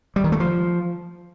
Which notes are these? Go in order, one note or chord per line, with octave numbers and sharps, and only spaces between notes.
G3
D#3
A3
F3